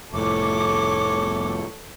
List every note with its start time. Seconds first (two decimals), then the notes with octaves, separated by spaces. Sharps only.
0.14 F1 A2 A4 C#5 D6